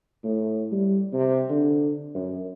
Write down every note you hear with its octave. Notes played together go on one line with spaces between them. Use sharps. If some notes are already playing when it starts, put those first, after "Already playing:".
A2
G3
C3
D3
F#2